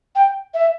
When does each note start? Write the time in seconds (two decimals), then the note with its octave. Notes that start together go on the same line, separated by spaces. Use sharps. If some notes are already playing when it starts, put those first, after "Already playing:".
0.15 G5
0.54 E5